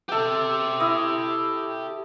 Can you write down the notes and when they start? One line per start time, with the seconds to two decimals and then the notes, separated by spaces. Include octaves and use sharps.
0.09 G4 A4 E5 G5
0.80 E4 D#5